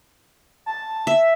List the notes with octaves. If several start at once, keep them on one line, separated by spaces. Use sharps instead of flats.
A5
E5